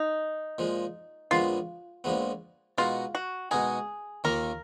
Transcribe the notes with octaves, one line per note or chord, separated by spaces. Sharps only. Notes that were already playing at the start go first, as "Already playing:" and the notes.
Already playing: D#4
A#2 F3 G#3
A#1 A#2 F3 G#3 B3 F4
A#1 A#2 F3 G#3 B3
B2 G#3 D#4 F4 F#4 A#4
F#4
B2 G#3 D#4 F#4 G#4 A#4
D#2 D#3 A#3 F4 A#4